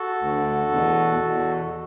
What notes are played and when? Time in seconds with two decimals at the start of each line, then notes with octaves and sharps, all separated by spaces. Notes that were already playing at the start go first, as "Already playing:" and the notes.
Already playing: F#4 A4
0.21 D2 D3
0.71 E2 B2
1.22 E2 B2